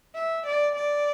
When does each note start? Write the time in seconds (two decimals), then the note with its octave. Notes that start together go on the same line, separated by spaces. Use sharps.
0.15 E5
0.46 D5
0.75 D5